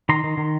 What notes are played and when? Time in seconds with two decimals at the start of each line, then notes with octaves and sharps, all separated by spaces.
0.09 D#3 A#5 C6
0.24 D#3
0.37 D#3